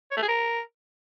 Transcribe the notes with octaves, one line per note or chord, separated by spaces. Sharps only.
C#5
A3
G#4
A#4